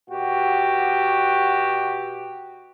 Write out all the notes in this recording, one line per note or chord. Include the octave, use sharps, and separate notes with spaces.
B2 F#4 G4